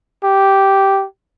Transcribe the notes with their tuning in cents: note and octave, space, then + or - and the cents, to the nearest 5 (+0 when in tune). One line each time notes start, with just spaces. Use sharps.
G4 -5